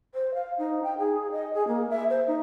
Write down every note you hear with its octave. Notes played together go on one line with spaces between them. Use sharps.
C5
F5
D#4
G5
G#4
D#5
G#4
A#3
E5
C5
D#4